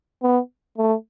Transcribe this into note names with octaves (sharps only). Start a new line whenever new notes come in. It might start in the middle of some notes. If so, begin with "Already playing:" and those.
B3
A3